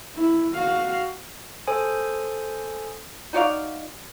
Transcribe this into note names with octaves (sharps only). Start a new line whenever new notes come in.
E4
F#4 F5
A4 C5 G#5 D#6
D#4 F#4 D5 F5